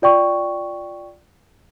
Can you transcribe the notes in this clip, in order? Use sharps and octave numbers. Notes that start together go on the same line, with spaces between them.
F4 D5 G5 C#6